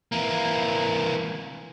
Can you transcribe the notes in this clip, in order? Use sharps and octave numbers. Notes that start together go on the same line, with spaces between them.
E3 A#3